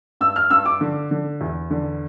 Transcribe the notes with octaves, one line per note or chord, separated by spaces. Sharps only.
G2 E6
F6
G2 E6
D6
D3
D3
E2
D3